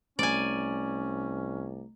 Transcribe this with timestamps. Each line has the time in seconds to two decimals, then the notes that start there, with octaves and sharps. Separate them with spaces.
0.19 C2 A3 C#4 D5 G#5 A#5